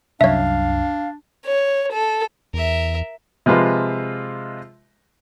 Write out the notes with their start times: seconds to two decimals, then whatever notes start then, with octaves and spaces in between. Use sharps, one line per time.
0.21 C2 F#2 D4 C#5 E5 F5
1.46 C#5
1.93 A4
2.54 E2 A#4 E5
3.46 C3 F3 G#3 F4 B4